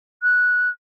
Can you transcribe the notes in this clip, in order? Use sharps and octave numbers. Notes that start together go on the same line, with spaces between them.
F#6